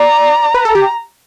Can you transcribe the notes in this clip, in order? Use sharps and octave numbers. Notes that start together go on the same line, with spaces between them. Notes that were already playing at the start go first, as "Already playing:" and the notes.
Already playing: D5 A#5
B4
A4
G4